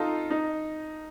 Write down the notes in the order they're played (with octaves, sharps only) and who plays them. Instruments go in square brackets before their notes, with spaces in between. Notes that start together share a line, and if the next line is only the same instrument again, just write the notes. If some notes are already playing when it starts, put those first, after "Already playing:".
Already playing: [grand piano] D#4 F4 A4
D#4